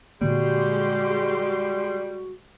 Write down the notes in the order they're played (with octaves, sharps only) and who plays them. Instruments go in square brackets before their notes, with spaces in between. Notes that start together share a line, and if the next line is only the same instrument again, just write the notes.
[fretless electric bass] A#2 D3 A#3 [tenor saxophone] G3 [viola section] G#3 G4 C6 [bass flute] F#4